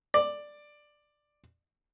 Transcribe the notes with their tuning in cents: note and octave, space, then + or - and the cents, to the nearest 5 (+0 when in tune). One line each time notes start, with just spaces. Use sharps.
D5 +10